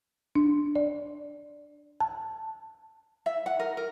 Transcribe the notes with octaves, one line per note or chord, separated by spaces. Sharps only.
D4
D5
A5
E5
F#5
A#4
A#4